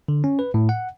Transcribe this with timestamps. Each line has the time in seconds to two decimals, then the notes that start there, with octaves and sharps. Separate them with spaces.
0.08 D3
0.24 C#4
0.39 B4
0.54 A2
0.69 F#5